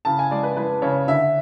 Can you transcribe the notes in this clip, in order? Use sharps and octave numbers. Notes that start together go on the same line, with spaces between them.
C#3 A5
G#5
G#3 D5
B4
G#3 B4
C#3 C#5
D3 E5